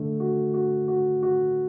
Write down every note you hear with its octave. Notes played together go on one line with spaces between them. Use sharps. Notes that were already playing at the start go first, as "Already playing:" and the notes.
Already playing: D3 A3
F#4
F#4
F#4
F#4